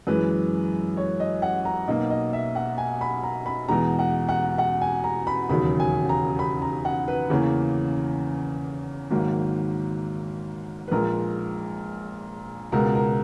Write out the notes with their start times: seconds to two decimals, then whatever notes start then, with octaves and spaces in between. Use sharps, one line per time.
0.07 F#2 E3 G#3 B4
0.97 C#5
1.20 D#5
1.42 F#5
1.65 A#5
1.88 B1 B2 F#3 A#3 D#5
2.10 D#5
2.33 E5
2.55 F#5
2.78 G#5
3.01 B5
3.23 A#5
3.46 B5
3.69 E2 B2 G#3 A#5
3.99 F#5
4.29 F#5
4.58 F#5
4.81 G#5
5.04 A#5
5.27 B5
5.49 E1 D#2 C#3 F#3 B5
5.80 G#5
6.09 A#5
6.39 B5
6.62 A#5
6.85 F#5
7.08 B4
7.30 E2 C#3 E3 A#3 C#5
9.10 G#1 G#2 D#3 F#3 A#3
10.88 B4
10.91 A#1 A#2 G#3 A#4
12.72 C#2 B2 G#3 A#4
12.95 A#4